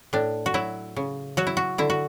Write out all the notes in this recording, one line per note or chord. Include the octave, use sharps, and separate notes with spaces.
A2 D4
F#4
F#3 E4
C#3
F#3 F#4
E4
F#4
D3 E4
F#4